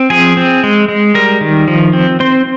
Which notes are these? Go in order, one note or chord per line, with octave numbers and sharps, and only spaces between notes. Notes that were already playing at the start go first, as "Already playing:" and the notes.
Already playing: C4
F3 G#4 G#5
C4
G#3
G#3
G3 A#4 A#5
D#3
F3
C4
C4 C5 C6